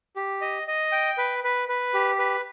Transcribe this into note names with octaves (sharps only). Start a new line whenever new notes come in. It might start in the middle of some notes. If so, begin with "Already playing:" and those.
G4
D#5
D#5
G5
B4
B4
B4
G4
B4